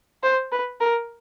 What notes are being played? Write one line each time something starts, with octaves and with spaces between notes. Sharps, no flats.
C5
B4
A#4